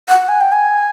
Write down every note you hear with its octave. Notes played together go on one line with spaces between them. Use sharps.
F#5
G#5
G5
G#5